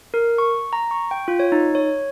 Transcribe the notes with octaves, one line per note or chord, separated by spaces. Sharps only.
A#4
C#6
A#5
C#6
G5
F4
C#5
D#4
C#5